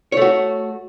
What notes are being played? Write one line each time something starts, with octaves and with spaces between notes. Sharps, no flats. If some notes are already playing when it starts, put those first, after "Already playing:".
A3 F#4 C#5